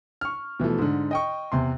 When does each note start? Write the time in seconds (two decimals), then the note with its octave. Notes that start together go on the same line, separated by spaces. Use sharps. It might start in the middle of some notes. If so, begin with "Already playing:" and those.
0.21 C#6 F6
0.60 B2 E3 F3 A3
0.78 G#2 D3
1.11 D#5 G5 C#6
1.52 E2 C3 C6